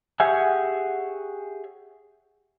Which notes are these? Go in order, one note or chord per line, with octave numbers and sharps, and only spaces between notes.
G4 G#4 C#5 E5 F#5 G#5